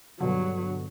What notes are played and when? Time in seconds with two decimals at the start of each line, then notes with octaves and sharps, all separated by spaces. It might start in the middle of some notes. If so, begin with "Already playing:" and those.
0.21 G2 B2 D3 F#3